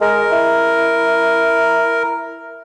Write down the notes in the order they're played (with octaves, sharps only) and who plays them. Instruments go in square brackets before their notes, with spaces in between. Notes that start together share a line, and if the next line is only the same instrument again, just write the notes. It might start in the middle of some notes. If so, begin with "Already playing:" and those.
[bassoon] G#3 [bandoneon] A#4
[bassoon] E4